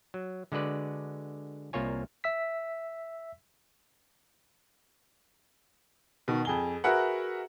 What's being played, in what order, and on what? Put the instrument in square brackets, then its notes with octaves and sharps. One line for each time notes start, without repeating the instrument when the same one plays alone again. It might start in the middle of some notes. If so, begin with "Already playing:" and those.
[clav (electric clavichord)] F#3
D3 G#3 F#4 B4 D5
C2 A#3 F4 C#5 G#5
[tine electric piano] E5 E6 B6
[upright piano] B2 D#3
F2 G#4 G7
F#4 G#4 A#4 B4 E5 F#5